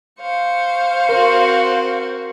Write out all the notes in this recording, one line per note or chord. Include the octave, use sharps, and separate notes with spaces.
C5 F5 C#6
C4 F#4 A#4